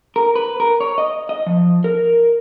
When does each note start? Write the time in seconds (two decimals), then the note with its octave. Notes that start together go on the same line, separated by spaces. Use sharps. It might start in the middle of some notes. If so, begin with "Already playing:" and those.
0.16 A#4
0.36 B4
0.60 A#4
0.80 C#5
0.98 D#5
1.29 D#5
1.46 F3
1.84 A#4